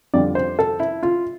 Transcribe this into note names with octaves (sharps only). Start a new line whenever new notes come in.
F2 D3 G3 D5
C5
A4
E4
F4